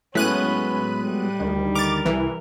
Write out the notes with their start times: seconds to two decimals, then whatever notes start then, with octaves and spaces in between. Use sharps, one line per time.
0.15 A2 F#3 G#3 B3 C#4 B4 F#6 D#7
1.06 G3
1.39 D2 D#3
1.75 A#4 D6 A6
2.06 C2 E3